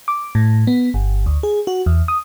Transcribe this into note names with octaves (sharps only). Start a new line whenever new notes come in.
D6
A2
B3
G1
D2
G#4
F#4
E2
D#6